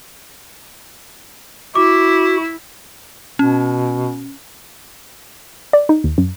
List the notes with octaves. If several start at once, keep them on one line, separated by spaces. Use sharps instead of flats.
E4 F#4 D6
B2 C#4
D5
D#4
D#2
F#2